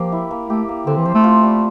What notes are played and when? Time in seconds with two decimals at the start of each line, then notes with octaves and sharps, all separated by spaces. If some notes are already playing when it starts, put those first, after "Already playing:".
Already playing: F3 A#3 G4
0.12 E4
0.31 A#3
0.50 A3 G4
0.69 A#3
0.87 D3 C4
0.97 E3
1.05 F3 C5
1.14 A3
1.24 F4
1.43 G3